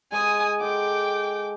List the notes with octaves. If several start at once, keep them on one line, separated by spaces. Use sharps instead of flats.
G#3 G#5 D#6
G#3 A4 F#5 G5 D6